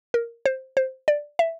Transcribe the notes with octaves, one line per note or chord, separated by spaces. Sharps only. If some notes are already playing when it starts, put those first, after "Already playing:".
A#4
C5
C5
D5
E5